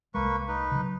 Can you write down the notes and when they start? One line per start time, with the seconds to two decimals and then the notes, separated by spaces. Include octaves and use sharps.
0.15 C2 G#3 A#3 B4 C#6
0.48 D#4 B4
0.71 C#3 F#3